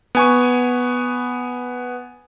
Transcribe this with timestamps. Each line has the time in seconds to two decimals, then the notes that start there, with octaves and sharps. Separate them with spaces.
0.15 B3 G#5 C#6